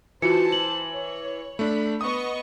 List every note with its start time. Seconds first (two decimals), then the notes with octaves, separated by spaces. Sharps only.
0.22 E3 F4 F#4 C5 A5 C#7
0.52 F#7
0.93 C#5
1.59 A3 D4 B5
2.01 B3 D#5 C#6 D#6